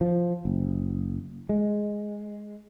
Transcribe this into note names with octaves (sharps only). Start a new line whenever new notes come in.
F3
F#1
G#3